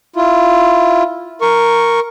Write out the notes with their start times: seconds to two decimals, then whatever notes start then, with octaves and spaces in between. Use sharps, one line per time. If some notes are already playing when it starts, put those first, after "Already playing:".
0.16 E4 F4
1.41 A#4 C#6